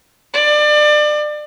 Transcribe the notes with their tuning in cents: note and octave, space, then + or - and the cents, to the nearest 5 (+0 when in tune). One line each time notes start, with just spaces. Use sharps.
D5 +30